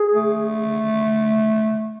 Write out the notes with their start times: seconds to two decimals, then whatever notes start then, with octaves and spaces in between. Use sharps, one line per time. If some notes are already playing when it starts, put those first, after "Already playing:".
Already playing: G#4
0.14 A3